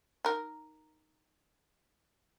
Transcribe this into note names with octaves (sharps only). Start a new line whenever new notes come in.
D#4 A#4